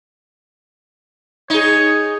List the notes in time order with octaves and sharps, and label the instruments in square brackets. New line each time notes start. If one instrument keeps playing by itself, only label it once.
[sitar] D#4 G#4 [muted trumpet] C#5